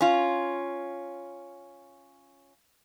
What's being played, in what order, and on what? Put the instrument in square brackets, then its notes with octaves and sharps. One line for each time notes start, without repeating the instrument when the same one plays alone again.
[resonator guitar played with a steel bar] C#4 F4